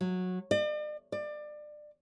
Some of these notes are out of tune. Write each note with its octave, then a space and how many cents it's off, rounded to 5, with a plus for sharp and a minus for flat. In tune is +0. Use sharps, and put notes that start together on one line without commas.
F#3 -15
D5 +45
D5 +25